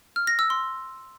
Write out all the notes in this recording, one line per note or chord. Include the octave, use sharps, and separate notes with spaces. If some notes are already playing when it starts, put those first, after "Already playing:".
F6
A#6
E6
C6